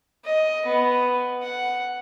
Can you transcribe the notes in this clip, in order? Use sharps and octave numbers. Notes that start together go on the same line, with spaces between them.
D#5
B3
F#5